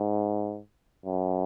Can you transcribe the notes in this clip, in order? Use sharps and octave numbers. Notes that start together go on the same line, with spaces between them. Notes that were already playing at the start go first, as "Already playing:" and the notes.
Already playing: G#2
F#2